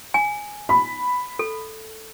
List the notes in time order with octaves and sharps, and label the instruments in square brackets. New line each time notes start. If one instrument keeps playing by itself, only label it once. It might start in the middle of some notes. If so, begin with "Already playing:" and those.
[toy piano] G#5
[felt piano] B5
[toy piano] A4